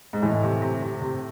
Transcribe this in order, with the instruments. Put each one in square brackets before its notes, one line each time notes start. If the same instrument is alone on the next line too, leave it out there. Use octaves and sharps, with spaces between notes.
[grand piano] G#2
[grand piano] A2 [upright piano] E3
[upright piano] C3
C3
C3
C3